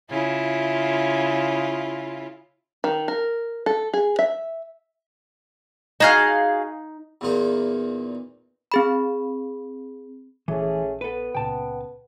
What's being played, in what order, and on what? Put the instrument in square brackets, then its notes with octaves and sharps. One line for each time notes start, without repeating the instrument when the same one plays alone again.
[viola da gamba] C#3 E4 F4
[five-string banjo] D#3
A#4
A4
G#4
E5
[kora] D#4 [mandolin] F#4 G#4 F5
[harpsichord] E2 A#2 D#4
[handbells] C4 G#4 B5
[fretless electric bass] A#1 [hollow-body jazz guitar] E3 [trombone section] A3 C#4 G#4
[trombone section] B3 [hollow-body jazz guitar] A4 B4
[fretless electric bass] C#2 A#2 C#3 [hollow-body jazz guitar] G5 A5